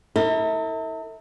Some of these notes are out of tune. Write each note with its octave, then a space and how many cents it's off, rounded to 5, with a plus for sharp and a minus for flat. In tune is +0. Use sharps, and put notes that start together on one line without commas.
E4 -35 A4 +45